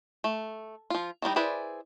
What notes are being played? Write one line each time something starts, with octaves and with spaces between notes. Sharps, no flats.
A3
F3 F4
D#3 E3 G3 D#4
E4 G#4 B4 C5 D5